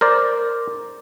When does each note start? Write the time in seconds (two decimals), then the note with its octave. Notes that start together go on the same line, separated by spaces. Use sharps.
0.01 A#4 C5 D5